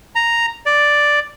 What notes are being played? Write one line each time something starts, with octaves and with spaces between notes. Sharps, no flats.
A#5
D5